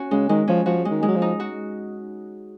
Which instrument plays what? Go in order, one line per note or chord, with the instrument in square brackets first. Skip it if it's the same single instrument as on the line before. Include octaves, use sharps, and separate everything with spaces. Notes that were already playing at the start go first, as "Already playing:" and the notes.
Already playing: [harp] C#4 F#4
[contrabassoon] C#3 [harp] G#3
[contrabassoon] D#3 [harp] G#3
[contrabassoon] F3 [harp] C#4
[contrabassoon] F3 [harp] F#4
[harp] G#3
[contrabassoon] D#3
[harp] G#3
[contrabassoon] F#3
F3
[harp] D#4
F#4